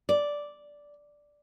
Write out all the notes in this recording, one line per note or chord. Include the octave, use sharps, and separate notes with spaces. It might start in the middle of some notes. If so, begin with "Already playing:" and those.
D5